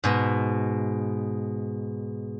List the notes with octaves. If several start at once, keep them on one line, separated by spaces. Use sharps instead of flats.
G#2 B2